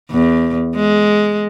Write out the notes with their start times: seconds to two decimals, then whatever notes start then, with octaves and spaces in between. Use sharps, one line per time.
0.11 E2
0.75 G#3